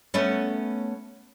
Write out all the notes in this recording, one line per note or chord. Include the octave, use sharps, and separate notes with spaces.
A3 B3 C#4